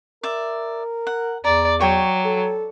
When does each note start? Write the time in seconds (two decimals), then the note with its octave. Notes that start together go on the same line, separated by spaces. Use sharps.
0.23 A#4 D5 E5
1.07 F#5
1.44 E2 D5 A#5
1.80 F#3 C#5 G5
2.25 A4